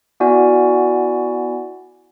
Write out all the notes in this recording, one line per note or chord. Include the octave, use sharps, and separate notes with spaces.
B3 E4 F#4 D5 G#5